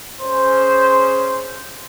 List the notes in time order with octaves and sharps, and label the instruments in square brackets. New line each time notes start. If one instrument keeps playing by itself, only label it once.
[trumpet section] C#4 G#4 C5